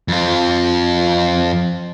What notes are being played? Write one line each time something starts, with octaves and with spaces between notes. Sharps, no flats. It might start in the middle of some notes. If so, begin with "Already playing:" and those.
F2 F4